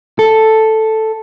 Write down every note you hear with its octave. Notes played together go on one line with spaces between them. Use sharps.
A4